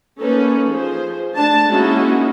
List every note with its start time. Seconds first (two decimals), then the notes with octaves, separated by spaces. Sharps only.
0.19 A#3 C#4 D#4 A4 B4
0.69 F3 G#4 C5
1.34 A3 D4 A5
1.69 G#3 A#3 C#4 D#4 E4 F#4